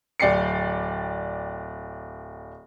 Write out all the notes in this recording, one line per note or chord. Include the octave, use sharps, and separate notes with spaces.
D1 D5 G5 C7 C#7